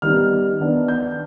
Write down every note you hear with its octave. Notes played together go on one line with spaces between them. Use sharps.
D#3 G3 B3 D#4 F6
D#3 B3 D4
G6